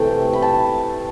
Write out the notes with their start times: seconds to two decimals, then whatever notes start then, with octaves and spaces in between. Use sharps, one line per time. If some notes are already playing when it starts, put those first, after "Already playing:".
Already playing: C3 E3 A3 G5
0.33 B5
0.42 A5